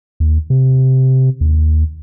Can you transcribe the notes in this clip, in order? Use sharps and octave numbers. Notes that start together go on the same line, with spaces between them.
D#2
C3
D#2